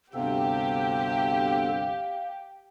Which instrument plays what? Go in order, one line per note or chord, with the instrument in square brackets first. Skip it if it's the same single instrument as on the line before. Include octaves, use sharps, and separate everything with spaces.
[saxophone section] D2 G2 C3 [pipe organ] B3 A4 [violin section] G4 [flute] F5